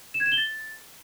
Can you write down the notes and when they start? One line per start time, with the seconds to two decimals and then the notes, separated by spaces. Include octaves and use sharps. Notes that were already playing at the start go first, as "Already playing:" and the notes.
0.14 E7
0.20 G#6
0.26 E7
0.32 G7
0.38 A6